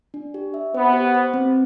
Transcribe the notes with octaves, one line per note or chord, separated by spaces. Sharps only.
D4
G4
E5
B3 C5
G4
C5
C4